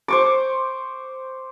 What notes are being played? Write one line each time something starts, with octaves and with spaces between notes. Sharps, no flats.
C5 C#6 D6